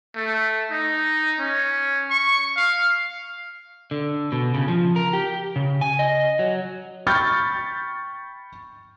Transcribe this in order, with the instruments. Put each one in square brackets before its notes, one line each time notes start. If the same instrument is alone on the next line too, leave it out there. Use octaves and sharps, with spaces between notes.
[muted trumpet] A3
D#4
C#4
C#6
F5
[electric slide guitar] D3
B2
C#3
F3
A#4
G4
C#3
G#5
D#5
F#3
[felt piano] G5 B5 C#6 F6 G6 A6